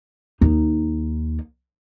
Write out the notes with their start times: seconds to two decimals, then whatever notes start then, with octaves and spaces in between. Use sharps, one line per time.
0.41 D#2 D#4